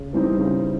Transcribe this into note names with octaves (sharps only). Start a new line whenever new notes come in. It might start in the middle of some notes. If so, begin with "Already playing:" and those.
Already playing: C#3
E3 G3 C4 D#4
C#3